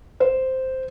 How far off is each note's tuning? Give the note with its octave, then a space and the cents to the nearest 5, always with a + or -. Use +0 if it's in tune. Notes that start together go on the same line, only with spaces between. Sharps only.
C5 -5